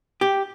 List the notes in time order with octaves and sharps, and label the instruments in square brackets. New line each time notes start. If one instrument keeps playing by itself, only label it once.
[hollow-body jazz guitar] G4